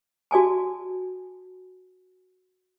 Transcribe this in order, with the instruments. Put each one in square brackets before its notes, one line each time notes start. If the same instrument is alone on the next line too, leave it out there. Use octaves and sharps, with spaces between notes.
[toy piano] F#4 D5 G#5 A5